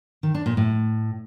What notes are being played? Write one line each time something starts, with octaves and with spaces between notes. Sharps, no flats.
D#3
D4
A#2
A2